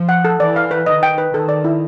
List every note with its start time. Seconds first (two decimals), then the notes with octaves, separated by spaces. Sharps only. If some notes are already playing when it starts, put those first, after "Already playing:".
Already playing: F3
0.09 F#5
0.25 A4
0.40 E3 D5
0.56 F5
0.71 B4
0.86 D#3 D#5
1.03 G5
1.18 B4
1.34 D#3 A4
1.49 D5
1.64 E4